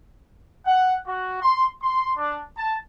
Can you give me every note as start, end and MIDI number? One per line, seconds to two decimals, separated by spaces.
0.66 0.96 78
1.06 1.42 66
1.42 1.67 84
1.82 2.12 84
2.17 2.41 62
2.56 2.76 81